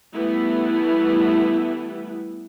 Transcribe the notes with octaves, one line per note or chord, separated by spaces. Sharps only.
E3 G3 A3 B3 E4